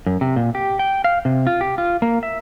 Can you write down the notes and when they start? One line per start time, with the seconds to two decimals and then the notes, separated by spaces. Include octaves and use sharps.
0.06 F#2
0.21 C3
0.36 A#2
0.55 G4
0.79 G5
1.04 F5
1.25 C3
1.47 F4
1.61 G4
1.78 F4
2.02 A#3
2.23 E5